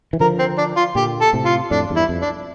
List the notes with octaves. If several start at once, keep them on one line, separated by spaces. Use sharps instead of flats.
E3
D3 F3 A#4
C4
D4
F4
A#2 D3 G4
A4
A2 C3
F4
F2 A2 D4
E2 G2
E4
F2
D4